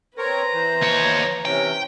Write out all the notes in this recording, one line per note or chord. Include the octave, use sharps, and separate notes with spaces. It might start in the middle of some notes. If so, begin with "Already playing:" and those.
C4 A#4 B4 C#5 A#5
E3 C5
D#2 C#5
C3 E3 C#4 G5